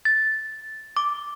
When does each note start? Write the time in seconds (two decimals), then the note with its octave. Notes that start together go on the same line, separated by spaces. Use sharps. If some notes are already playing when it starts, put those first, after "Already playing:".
0.05 A6
0.97 D6